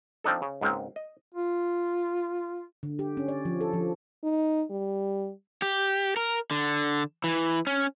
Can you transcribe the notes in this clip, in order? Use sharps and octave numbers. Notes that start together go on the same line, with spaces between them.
F3 C4 D4 D#4 A4
C#3
C#2 G#2 G#3 A#3 C4
D#5
F4
D3
G4
C#4
D5
F3
A4
F3
D#4
G3
G4
A#4
D3
E3
C#4